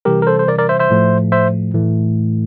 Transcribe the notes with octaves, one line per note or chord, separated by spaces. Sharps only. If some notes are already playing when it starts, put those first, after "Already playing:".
C3 E3 G3 G4 A#4
A#4
A4 C5
C5
A#4 D5
A#4 D5
C5 E5
C5 E5
A2 F3 A3
C5 E5
A2 E3 A3